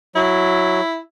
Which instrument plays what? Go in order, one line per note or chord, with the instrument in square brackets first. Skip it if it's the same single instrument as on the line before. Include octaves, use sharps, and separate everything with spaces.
[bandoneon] F#3 [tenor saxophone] E4